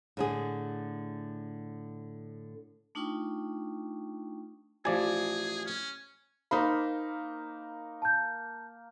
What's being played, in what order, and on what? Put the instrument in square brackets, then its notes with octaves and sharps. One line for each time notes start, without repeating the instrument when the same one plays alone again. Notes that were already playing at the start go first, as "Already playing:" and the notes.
[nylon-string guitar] A2 D3 G#4
[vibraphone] A3 D4 D#4 F4 G5 C#6
[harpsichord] A1 [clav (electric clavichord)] F3 D5 G#5 [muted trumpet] G#4
[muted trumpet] C#4
[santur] A#3 [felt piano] D#4 C5 B5
[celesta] A5 G6